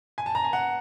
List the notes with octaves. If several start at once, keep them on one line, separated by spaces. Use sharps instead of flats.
G#5
A5
A#5
G#5
F#5